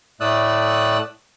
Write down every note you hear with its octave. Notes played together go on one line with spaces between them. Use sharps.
A2 A3 D5 D#6 E6 F#6